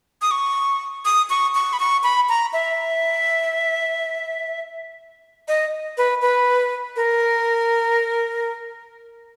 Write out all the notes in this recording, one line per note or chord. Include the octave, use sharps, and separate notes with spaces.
D#6
C#6
D#6
C#6
C#6
B5
C#6
B5
A#5
E5
D#5
B4
B4
A#4